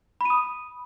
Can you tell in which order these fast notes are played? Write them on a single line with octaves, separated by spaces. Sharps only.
B5 D#7 D#6